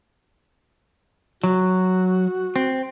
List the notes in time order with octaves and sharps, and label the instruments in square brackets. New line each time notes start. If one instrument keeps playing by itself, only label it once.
[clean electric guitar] F#3 [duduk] F#4
[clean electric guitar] C4